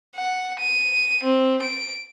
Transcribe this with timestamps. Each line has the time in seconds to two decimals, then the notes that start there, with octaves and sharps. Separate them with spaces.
0.16 F#5
0.60 D#7
1.23 C4
1.62 D7